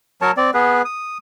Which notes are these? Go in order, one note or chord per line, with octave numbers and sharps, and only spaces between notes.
F#3 A#4 C#5 A5
C4 D5
B3 G#4 B4
D#6